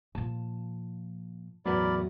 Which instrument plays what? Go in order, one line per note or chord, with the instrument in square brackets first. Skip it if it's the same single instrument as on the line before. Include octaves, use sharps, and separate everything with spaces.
[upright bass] A#2 F3 [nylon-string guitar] A5
[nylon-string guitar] E2 A2 B4 [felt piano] F#3 [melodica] A#4 D5 B5